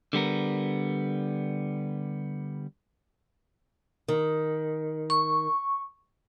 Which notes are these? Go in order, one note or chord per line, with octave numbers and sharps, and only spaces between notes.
D3 G3 B3 A#4
D#3
C#6